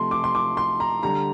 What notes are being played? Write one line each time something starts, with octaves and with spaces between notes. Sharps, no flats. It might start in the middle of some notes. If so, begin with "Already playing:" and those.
Already playing: C3 F3 A3 C6
D6
C6
D6
C6
A#5
D3 G3 A#5